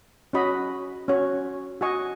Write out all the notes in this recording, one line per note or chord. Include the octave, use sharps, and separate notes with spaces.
C#4 F#4 D#5 B5
C#4 F#4 C#5
F#4 D#5 G#5 C#6